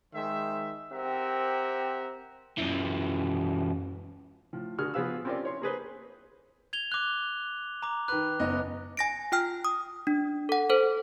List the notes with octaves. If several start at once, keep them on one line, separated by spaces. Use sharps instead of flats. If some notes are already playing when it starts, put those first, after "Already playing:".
D#3 G#3 C5 E5
C4 G4 A#4 E5 F#5
F#2 E3
A2 F3
D3 F#4 G#4 A#4 F6
F3 B3 G#4 B4 F5 E6
C4 C#4 F4 G4 A#4 D5
E4 C#5 C6
A#3 G#4 B4 C5
G#6 F7 G7
D6 F#6
A#5 D6
D#3 B4 F#6
F#1 B3 D#5
G#5 A#6 D7
F4 G5 F6
D#6
D4
A4 F#5
A4 C5